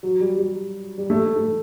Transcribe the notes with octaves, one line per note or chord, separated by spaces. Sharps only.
F#3
G3
G3
G3
A3
A3